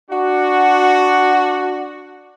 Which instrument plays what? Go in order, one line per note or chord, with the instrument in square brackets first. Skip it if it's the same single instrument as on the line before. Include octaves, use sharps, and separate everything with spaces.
[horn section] D4 F#4